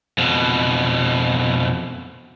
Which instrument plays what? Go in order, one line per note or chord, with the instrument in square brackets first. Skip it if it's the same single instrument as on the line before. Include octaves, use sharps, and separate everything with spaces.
[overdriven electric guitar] F2 B2